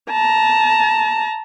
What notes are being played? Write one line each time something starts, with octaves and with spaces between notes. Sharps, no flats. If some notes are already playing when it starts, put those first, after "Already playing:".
A5 A#5